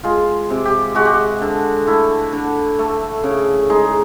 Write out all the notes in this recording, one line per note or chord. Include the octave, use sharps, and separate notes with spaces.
G#3 F4
C3
G4
G#3 F#4
G4
F#4
D3
A3 E4
D3
A3
C#3
G#3 D#4